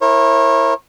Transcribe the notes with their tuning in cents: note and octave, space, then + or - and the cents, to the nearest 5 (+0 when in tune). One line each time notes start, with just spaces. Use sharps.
E4 +0 A#4 +0 C#5 -35